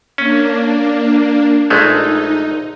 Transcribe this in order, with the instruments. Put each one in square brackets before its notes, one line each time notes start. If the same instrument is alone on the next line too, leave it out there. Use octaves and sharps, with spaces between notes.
[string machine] A#3 D4 [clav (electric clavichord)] C#4
[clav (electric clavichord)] A#1 G#3 A3 [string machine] D#4